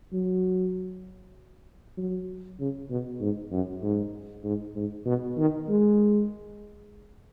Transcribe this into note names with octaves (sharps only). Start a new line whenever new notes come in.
F#3
F#3
C#3
B2
G#2
F#2
G#2
G#2
G#2
B2
D#3
G#3